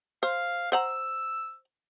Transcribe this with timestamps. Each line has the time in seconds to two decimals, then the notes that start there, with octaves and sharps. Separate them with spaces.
0.23 C5 F5
0.72 C5 F#5 A#5 E6